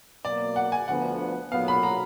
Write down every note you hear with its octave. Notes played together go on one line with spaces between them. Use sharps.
B2 F#3 A#3 D5
F#5
G#5
D2 D3 F3 B3 F#5
B1 A#2 F#3 B3 F5
B5
A#5